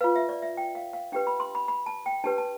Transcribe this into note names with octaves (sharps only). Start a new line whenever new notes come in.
F4 B4 F5
E5
D5
E5
G5
F5
F5
D4 G4 B4 G5
B5
C6
B5
B5
A5
G5
D4 G4 B4 A5
A5